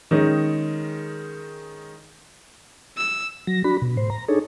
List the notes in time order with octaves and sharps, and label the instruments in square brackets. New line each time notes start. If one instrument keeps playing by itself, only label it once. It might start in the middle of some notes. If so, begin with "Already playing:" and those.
[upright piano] D#3 G#3 C#4 D#4
[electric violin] E6
[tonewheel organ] F#3 A#6
D4 F#4 B5
B2
A2 C5
A#5
D4 D#4 G#4 A4 C#5